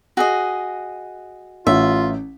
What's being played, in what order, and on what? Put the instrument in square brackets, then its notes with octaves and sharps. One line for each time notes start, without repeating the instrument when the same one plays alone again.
[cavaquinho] F#4 G#4 D#5
[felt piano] A1 [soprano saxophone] F4 [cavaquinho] E5